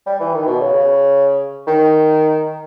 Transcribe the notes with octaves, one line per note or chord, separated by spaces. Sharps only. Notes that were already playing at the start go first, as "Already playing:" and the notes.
G3
E3
D#3
B2
C#3
C#3
D#3